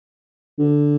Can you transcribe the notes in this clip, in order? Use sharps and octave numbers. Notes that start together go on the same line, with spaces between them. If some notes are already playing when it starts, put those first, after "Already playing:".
D3